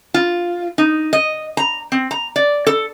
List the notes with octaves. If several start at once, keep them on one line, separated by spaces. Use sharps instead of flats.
F4
D#4
D#5
A#5
C4
A#5
D5
A4